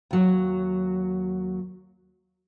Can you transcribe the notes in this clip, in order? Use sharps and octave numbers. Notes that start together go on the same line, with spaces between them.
D#2 F#3